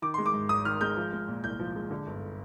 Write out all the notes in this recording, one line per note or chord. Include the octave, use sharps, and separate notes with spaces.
D#3 D6
G#3 C6
D6
G#2
G#1 D#6
D#3 F6
G#3 G6
F3
G#3
A#2
C2 G6
F3
G#3
D3
G1